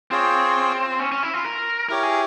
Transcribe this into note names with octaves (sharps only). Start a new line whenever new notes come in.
C4 F4 G#4 C#5
C#4
C#4
E4
F4
A#4
E4 G4 A#4 C#5
G#4